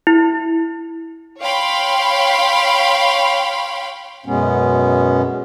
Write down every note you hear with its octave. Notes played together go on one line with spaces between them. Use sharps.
E4
C#5 F5 G5 B5 C6
F#2 B2 G#3 B3 C#4